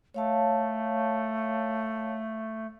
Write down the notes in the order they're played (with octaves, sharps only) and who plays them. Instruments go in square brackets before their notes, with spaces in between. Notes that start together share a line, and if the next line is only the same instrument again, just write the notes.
[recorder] A3 [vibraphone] C#5 F5 A5